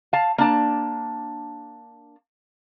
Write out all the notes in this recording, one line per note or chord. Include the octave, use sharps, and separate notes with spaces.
F5 A5
A#3 D4 A5